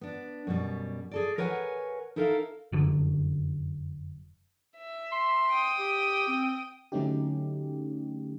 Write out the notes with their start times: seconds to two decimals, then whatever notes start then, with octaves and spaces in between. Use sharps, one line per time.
0.01 B3 D4
0.47 F#2 B2 G3
1.11 G#4 A4 D5
1.38 A#4 B4 C#5 F#5 G#5
2.16 D#4 E4 A4 A#4 D#5 F5
2.72 F1 F#2 D3
4.78 E5
5.12 C6
5.49 G5 D#6
5.78 G4
6.28 C4
6.92 D3 F#3 A3 C#4 D#4 G4